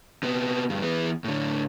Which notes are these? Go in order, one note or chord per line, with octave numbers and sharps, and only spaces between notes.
C3 B3
D2 G2
E3 B3
A2 D3